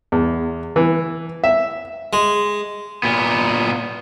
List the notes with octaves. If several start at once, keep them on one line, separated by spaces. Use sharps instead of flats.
E2
E3
E5
G#3
A#2 B3